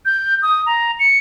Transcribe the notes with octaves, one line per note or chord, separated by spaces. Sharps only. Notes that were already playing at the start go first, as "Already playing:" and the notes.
G6
D#6
A#5
C#7